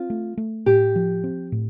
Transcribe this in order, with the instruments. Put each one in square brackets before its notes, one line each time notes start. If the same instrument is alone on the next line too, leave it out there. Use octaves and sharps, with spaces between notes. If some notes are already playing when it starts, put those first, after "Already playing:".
Already playing: [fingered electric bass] C4 [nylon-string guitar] F4
[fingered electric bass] A3
A3
[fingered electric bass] A2 [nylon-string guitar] G4
[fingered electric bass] F3
C4
A2